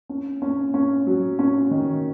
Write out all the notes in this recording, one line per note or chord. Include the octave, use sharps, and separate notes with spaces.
C#4
C#4
C#4
F#3
C#4
D#3